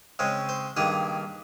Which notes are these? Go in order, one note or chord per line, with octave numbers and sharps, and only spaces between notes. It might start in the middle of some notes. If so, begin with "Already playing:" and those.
C#3 G#3 C4 C#5
C5
G2 D#3 A#3 G#4